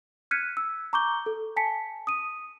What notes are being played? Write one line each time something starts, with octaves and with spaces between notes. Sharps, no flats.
F6 F#6 G#6 B6 C#7 D#7
E6
A#5 C#6 D6 G6 G7
A4
G#5 A5 B6 C#7
D#6 D#7